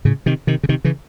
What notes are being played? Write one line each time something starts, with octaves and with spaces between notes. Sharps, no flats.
A2 C#3
C3 D#3
C3 D#3
C#3
C3 D#3
C#3 E3